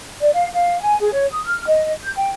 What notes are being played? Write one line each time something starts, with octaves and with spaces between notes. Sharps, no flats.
D5
F5
F5
G#5
G#4
C#5
D#6
F6
D#5
G6
G5